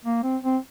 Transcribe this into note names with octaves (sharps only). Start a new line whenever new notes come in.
A#3
C4
C4